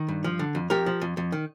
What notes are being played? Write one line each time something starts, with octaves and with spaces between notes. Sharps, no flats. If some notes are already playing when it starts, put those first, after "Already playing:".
Already playing: D#3
G2
F3
D3
F2
F2 G4 A#4
F3
F2
F2
D#3